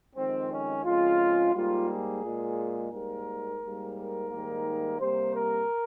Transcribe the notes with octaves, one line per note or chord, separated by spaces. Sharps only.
F2 D#3 G#3 C4
C#4
F2 C#3 G#3 F4
G#2 G3 A#3 F4
G#4
A#2 G#3
G#2 G3 A#3 A#4
G#2 G3 A#3
A#4
G#2 D#3 G3 A#3
C3 G3 A#3 C5
A#4